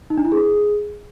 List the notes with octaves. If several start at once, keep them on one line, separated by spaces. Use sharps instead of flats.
D#4
D4
E4
G#4